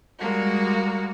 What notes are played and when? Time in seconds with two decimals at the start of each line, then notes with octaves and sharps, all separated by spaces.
0.18 G3 G#3 A#3 F#4